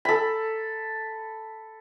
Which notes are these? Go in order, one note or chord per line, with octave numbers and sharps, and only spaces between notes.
A4 B5